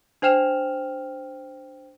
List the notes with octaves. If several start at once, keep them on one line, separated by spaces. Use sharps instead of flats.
D4 C5 G5 F6 E7 F7